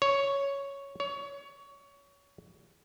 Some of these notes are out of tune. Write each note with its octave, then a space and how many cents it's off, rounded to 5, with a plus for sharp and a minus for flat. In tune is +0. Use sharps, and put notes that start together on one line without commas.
C#5 +5
C#5 +25